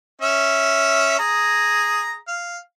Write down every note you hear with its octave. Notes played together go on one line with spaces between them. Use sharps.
C#4 E5
G#4 A#5
F5